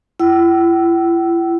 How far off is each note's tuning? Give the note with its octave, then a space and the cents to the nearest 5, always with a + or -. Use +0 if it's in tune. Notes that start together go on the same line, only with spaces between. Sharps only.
E4 +40 G5 -45 E6 +0